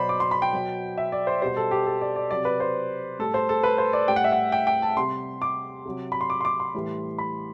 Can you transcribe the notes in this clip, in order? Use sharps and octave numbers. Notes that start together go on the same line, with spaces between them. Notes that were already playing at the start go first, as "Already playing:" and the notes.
Already playing: B2 F#3 C5 D5 B5
D6
C6
B5
G5
B2 F#3
E5
D5
C5
B2 G3 C5
A4
G4
A4
D5
D5
C3 F#3 D5
B4
C5
A2 G3 A4
C5
A4
B4
C5
D5
A2 G3 G5
F#5
E5
F#5
G5
G5
A5
C3 G3 C6
D6
C3 F#3
B5
C6
D6
C6
D6
C6
A2 E3 G3
B5